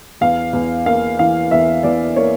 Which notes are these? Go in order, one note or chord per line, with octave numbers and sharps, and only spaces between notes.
E2 F5
E2
A#3 F5
E3 F5
E2 E5
E2 D5
A#3 C#5